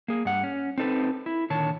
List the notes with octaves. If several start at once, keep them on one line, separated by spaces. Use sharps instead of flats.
A#3 G#4
G2 F#5
C#4
C4 D#4 A4 B4
E4
A#2 D3 D#3 C#5 A5